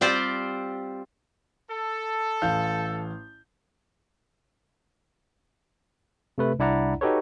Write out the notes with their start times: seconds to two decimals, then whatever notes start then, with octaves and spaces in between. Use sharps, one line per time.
0.01 G3 C4 F4 G4 C5 D5
1.69 A4
2.42 A1 F5 G6
6.38 C3 A3 B4
6.59 C2 D4 E4 D5 F#5 A#5
7.01 D#4 F#4 G4 A4 B4 C#5